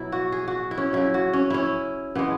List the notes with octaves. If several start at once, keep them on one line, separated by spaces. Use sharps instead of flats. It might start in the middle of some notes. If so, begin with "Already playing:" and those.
Already playing: B2 F#3 E4
F#4
G#4
F#4
E4
C#4
C#3 F#3 E4
F#4
C#4
C#4 E4
C#3 E3 G#3 B3